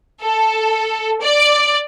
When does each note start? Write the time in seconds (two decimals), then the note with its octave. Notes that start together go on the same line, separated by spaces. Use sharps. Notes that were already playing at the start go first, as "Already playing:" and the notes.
0.22 A4
1.22 D5